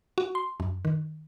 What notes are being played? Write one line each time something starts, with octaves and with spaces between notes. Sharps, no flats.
F#4
C6
F#2
D#3